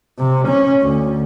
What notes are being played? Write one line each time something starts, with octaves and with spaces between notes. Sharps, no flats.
C3
C#4
D2